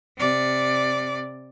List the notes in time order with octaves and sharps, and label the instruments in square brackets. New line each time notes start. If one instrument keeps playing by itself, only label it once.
[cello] C3 D5